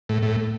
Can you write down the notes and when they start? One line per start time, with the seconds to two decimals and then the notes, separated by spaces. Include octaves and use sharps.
0.09 A2
0.22 A2